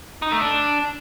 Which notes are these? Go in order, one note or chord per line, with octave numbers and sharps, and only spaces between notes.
D#4
A3
D4